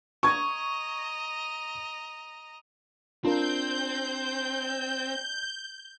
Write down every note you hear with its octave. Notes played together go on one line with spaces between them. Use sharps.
D#5 A#5 C#6 G#6
C4 D4 F4 A#4 G6